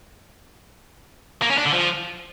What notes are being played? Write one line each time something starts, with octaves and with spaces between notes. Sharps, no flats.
A#3
C#4
D4
D3
F3